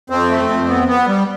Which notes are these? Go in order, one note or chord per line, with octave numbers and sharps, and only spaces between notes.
F2 C4
A3
F2
B3
B3
G3